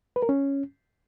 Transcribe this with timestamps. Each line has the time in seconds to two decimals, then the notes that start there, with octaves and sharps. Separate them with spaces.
0.16 B4
0.23 A#4
0.29 C#4